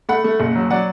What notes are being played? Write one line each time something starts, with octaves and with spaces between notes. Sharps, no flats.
A3 F#5 B5
A3
F#1
F#3
F#3 D5 F#5